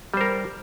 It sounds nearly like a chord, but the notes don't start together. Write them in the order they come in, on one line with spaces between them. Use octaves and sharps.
G3 C5 A#4